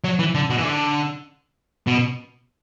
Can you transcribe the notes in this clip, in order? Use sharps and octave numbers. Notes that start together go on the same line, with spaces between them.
F#3
E3
D3
B2
E3
D3
B2